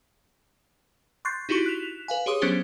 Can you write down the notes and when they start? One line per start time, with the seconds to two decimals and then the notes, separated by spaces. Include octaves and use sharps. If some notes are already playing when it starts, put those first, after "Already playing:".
1.25 C6 C#6 F#6 G6 A6 C7
1.49 D#4 E4 F#4 G4 C#6
1.66 F#6 B6 E7 F7
2.08 B4 F5 G#5
2.26 G4 G#4 C#5 C6 D6 D#6
2.42 F#3 B3 C#4 D4 G4 C5